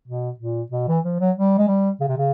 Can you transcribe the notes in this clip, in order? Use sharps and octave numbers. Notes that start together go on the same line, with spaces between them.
B2
A#2
B2
E3
F3
F#3
G3
G#3
G3
C#3
C3
C#3